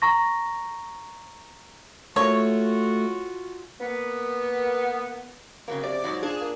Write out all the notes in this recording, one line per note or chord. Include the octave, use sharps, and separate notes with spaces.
A#5 C#6 A#6
A3 A#3 F4 F#4 C#5
A#3 B3
C#3 F#3 A#3 C4
C3 D5
G#2 B2 F3 F#3
D4 F4 G#4
A#3